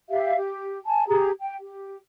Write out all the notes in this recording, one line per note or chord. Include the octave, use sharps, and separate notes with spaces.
G4 E5 F5
G4
G#5 A5
G4 G#4 A#5
G5
G4